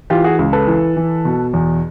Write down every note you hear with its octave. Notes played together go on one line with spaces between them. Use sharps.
E3 F4 G4
F#4 G#4
C#2
A4 B4
E3
E3
B2
E2